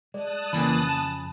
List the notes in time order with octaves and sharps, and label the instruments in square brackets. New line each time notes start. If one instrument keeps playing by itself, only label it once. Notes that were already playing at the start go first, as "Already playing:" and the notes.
[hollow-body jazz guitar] G#3 [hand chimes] D5 [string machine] A5 D#6 F#6
[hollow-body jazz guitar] F2 C#3 [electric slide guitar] E3 A#3 [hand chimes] G#5 B5
[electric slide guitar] A5